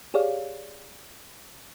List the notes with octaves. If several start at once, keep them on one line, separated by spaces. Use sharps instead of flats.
G4 G#4 C#5 D5 F5